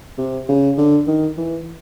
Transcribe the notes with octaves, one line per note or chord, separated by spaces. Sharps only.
C3
C#3
D3
D#3
E3